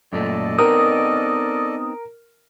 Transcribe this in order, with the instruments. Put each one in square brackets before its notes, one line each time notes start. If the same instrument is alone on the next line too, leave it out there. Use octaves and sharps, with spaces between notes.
[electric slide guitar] F#2 A#2 A3 [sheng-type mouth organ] A4 D5 D#5
[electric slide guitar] B3 C4 D#4 [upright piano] A#4 [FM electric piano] D#6